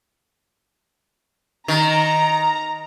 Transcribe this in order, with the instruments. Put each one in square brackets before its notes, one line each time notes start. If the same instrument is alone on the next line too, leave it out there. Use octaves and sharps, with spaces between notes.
[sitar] D#3 [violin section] A#5